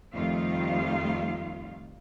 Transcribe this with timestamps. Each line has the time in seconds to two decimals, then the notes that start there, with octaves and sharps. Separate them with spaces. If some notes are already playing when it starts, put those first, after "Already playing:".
0.14 F2 D#3 G3 A3 F4 F5